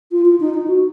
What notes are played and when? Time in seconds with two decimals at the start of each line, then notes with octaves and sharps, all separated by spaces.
0.12 F4
0.25 F4
0.40 D#4
0.54 D#4
0.68 F#4